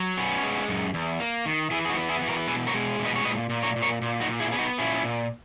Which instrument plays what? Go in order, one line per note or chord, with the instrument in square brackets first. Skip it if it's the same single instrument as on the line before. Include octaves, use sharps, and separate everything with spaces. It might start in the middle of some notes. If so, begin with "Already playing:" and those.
Already playing: [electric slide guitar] F#3
B3 C#4
G#3
F#2
E2
A#3
D#3
E3 E4 G#4
G#4
D#4 F#4
B3
E4 G#4
E3
F#4 A#4
B2 G#4 B4
A#4 C#5
G#3
B2
B4 D#5
C#5
A#2 B4 D#5
A#2
A#4 C#5
A#2
A#4 C#5
A#2
D#4 F#4
A#2
E4 G#4
B3 G#4
D#4 F#4
A#2 C#4 E4
A#2